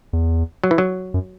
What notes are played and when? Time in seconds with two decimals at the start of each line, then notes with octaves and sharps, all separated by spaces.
0.13 E2
0.64 F#3
0.71 E3
0.78 F#3
1.14 F#2